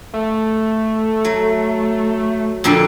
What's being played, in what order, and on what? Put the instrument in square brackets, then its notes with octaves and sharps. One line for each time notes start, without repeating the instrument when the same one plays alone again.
[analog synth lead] A3
[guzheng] F#3
F2 A#2 D3